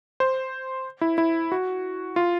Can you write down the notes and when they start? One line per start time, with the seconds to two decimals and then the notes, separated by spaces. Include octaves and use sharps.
0.20 C5
1.01 E4
1.18 E4
1.52 F#4
2.16 F4